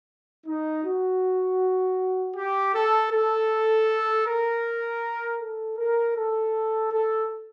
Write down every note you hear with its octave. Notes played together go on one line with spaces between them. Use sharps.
D#4
F#4
G4
A4
A4
A#4
A4
A#4
A4
A4